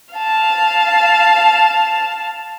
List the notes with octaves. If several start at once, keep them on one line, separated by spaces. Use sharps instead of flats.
F5 A5